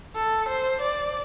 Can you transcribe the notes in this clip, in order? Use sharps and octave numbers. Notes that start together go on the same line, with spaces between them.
A4
C5
D5